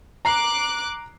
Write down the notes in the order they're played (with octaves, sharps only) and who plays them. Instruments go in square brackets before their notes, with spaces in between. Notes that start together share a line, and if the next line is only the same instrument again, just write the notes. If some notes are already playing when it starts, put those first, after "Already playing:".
[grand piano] A#5 C7 [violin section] D6 F#6